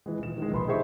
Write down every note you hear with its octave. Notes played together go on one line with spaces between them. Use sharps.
E3 G#3
D#1 E7
D#3 G#3
A#1 B4 B5 C6
D#4 G4 G#4 C5 E5 C#6